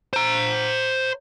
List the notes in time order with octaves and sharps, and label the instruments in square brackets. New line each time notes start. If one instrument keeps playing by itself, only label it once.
[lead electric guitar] C5 A#5